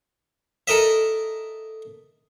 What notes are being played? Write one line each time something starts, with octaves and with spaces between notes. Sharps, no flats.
A4 A#4 D#5 E5